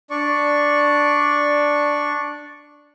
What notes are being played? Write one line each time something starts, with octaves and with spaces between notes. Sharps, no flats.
D4 D5 C#6